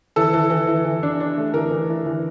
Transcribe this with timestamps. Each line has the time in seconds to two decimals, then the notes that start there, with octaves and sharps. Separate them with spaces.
0.16 E3 A4
0.33 E3
0.50 E3
0.67 E3
0.85 E3
1.03 D4
1.20 D4
1.37 A3
1.54 E3 A#4
1.71 E3
1.89 E3
2.06 E3